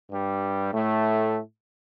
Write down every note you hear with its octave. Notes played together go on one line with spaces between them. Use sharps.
G2 G3
A2 A3